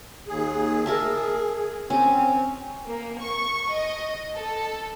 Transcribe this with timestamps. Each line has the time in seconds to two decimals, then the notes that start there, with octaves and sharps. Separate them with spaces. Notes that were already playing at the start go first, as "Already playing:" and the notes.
0.28 D#2 G#4
0.86 G#4 A#4 E5 A5
1.90 C4 C#4
2.87 A#3
3.22 C#6
3.73 D#5
4.36 A4